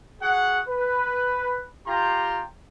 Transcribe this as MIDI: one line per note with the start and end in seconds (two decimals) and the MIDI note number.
0.22 0.60 66
0.22 0.60 68
0.22 0.60 78
0.68 1.66 71
1.87 2.43 65
1.87 2.43 67
1.87 2.43 79
1.87 2.43 82
1.87 2.43 84